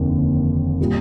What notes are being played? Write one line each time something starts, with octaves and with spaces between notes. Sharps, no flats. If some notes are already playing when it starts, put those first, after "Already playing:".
Already playing: F1 D#2 D3
A#2 G3